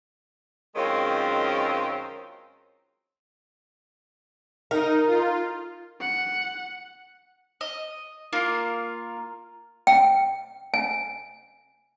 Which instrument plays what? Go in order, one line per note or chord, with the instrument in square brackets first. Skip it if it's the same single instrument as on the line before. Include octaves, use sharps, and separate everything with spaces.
[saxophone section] F#2 D#3 G#3 C4 C#4 F4
[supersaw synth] D#4 [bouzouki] A#4
[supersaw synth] F4
[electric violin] F#5
[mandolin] D#5
A#3 F4 A#4
[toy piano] G5
G#5